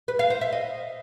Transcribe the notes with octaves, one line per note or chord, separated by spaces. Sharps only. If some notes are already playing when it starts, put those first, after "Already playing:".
B4
F5
C5
E5
D#5